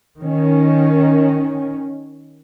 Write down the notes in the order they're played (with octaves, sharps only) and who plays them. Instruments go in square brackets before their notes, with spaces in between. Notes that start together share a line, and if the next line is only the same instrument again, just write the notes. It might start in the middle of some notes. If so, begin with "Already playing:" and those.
[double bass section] D#3 C#4